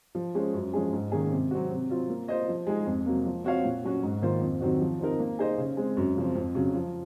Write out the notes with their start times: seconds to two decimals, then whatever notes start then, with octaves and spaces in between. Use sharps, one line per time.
0.15 F3
0.35 G#3 C#4 G#4 C5
0.54 F#2
0.73 F3 G#3 C#4 G#4
0.93 G#2
1.12 D#3 A#3 C#4 G#4
1.31 C3
1.51 F#3 C4 F#4
1.71 C3
1.89 F#3 C4 F4
2.09 A#3
2.28 F4 C5 D#5
2.48 F3
2.67 G#3 D#4 G#4
2.86 F2
3.06 C3 F#3 A#3
3.25 F3
3.44 C4 F#4 C#5 F5
3.64 A#2
3.83 F#3 C#4 F#4
4.03 G#2
4.22 D#3 A#3 F4 C5
4.41 F2
4.61 D#3 F#3 C4 F#4
4.81 F3
5.00 C4 D#4 A#4
5.20 A#3
5.39 D#4 G#4 C5 D#5
5.58 C#3
5.77 G#3 C4
5.97 F#2
6.16 C#3 F3 C4
6.36 F2
6.55 C#3 F#3
6.75 F3